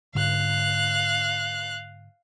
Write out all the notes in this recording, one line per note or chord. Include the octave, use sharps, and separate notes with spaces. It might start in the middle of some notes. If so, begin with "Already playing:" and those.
G#2 D3 F5 F#6